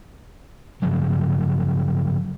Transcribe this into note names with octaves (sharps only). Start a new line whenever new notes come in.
G2 C#3 F3 F#3